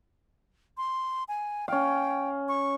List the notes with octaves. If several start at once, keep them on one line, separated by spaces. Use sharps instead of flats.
C6
G#5
C#4 F5 G5
C#6